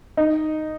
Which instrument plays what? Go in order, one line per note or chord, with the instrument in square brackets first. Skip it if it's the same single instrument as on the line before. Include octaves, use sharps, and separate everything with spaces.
[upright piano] D#4